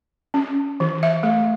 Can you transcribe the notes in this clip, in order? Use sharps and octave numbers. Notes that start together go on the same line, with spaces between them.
C#4
E3
E5
A3